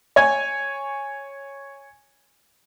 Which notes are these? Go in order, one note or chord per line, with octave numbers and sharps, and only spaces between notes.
C#5 G#5 G#6